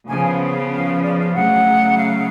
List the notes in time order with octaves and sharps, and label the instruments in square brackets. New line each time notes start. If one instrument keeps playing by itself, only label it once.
[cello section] C#3 F3 B3 [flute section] G#5
[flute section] F5
D5
F5
[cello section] C#3 F#3 A3 [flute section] F#5
[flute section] F5